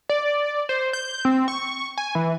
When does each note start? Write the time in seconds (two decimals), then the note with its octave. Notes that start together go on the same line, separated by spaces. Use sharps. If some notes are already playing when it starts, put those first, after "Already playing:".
0.09 D5
0.69 C5
0.93 G6
1.25 C4
1.48 C#6
1.98 G#5
2.15 E3